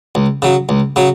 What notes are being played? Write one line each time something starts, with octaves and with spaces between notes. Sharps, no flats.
C#2
C#3 F#3
C#2
C#3 F#3